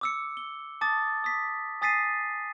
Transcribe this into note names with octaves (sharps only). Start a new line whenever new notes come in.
D6 E6 C#7
G7
A5 D6 D#6 A6
D#6 B6
G#5 D#6 A6 B6 C7 D#7